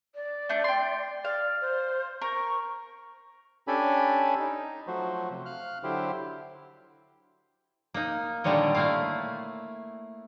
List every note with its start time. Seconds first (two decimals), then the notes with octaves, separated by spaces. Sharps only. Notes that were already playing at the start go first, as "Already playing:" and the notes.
0.15 D5
0.49 A3 D4 G6
0.64 G5 C6
1.25 D5 F5
1.61 C5
2.22 A#4 C#6
3.68 C#4 D4 G4 A4 G#5 B5
4.39 D#4
4.87 F3 F#3 A3 F#4 C5
5.30 C3
5.46 F5 F6 F#6
5.83 D3 F#3 E4 G4 C5
7.94 A#3 D#4
8.44 A#2 D3 D#3 G3 C#5 D#5
8.75 A3 A#3 E4 F5